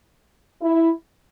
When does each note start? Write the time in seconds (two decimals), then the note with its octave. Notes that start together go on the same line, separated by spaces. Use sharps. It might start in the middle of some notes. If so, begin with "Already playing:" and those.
0.61 E4